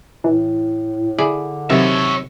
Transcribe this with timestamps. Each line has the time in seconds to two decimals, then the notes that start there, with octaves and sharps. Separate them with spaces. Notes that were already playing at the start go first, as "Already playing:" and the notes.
0.24 A2 E3
1.19 D3 E4 G#4 D5
1.70 C3 D#3 F#3 C#5 E5